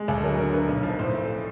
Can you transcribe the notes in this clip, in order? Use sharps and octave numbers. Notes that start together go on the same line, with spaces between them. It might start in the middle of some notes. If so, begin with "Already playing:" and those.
Already playing: G#3
D2 A4
F#3 A#4
D3 A#4
A#3 B4
B1
F3
A2 C5
A3